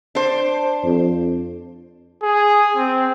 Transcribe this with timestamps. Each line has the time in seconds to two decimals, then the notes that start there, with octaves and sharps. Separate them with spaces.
0.15 D4 C5
0.85 F2
2.22 G#4
2.76 C4